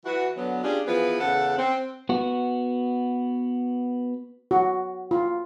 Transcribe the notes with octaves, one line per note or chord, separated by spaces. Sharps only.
E3 F#4
D3 F#3 B3
C#4 D4 F4 G4 G#4
E3 F3 B3 G#4 B4
E2 C#3 A4 F#5
C4
B3 F#4
F#4
F4